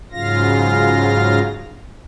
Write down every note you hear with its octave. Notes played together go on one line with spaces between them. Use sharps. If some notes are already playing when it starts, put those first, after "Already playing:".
G#2 C#3 F#3 F4 F5 A#6